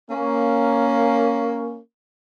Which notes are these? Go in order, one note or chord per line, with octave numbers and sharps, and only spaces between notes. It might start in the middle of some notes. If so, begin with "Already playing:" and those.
A#3 C#4